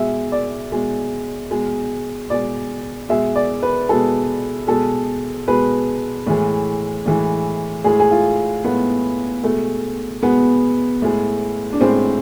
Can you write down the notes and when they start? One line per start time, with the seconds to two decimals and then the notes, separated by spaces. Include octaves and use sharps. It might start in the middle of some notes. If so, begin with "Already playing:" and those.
Already playing: B2 G#3 E5
0.32 D5
0.72 B2 G#3
1.51 B2 G#3
2.30 B2 G#3 D5
3.09 B2 G#3 E5
3.36 D5
3.63 B4
3.89 B2 G#3 A4
4.67 B2 G#3 A4
5.48 B2 G#3 B4
6.27 A2 E3 G#3
7.06 A2 E3 G#3
7.84 A2 G#3 G#4
7.99 G#4
8.11 F4
8.64 A2 G#3 B3
9.43 B2 G#3 A3
10.22 B2 G#3 B3
11.02 A2 G#3
11.73 D4
11.81 A2 G#3 C4